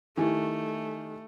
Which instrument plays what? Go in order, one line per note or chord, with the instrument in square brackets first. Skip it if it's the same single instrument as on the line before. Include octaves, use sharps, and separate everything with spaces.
[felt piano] D#3 G4 G#5 [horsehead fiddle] A3 [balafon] E4